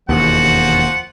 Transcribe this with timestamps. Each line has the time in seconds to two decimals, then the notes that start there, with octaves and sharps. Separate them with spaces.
0.09 E1 D#2 F3 F#4 F#5